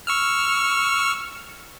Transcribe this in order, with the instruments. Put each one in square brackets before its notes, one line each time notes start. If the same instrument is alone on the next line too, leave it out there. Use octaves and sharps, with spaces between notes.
[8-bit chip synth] C#6 E6 F6